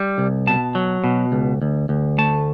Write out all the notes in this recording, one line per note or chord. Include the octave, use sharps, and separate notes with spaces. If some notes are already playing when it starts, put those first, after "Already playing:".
Already playing: G3
C2
B2 A5
F#3
B2
C#2
D2
D2
A3 A5